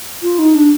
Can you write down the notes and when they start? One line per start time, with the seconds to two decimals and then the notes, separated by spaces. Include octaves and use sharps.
0.22 F4
0.39 D#4
0.55 D4